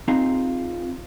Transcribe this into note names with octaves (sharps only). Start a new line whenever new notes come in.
C4 D#4 F4 G#4 A#5